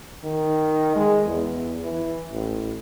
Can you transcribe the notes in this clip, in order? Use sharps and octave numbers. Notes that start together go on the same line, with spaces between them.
D#3
G#3
E2
E3
A1